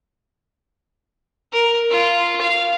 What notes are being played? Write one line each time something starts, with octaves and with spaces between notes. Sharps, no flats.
A#4
F4
F5